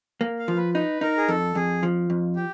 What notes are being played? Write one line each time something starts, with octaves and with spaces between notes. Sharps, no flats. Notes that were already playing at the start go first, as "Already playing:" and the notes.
A#3
F5
F3
B4
D#4 B4
D#4 A#4
G#4
F2 A4
F2 G#4
F3
F2
G4